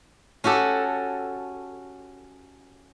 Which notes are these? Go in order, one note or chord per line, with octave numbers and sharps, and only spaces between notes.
C#4 F#4 G4 A4